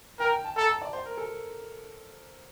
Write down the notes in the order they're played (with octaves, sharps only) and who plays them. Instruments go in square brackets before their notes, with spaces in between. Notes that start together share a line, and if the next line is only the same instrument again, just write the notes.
[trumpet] A#4 [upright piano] G5
[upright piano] G5
A5
[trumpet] A4 [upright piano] A#5
[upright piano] A5
D5
C5
A#4
A4